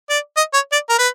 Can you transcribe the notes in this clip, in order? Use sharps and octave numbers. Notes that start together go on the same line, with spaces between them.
D5
D#5
C#5
D5
A#4
B4